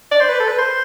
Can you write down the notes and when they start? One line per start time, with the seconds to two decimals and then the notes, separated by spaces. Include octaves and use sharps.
0.11 D5
0.20 C5
0.29 B4
0.40 A4
0.48 B4
0.58 C5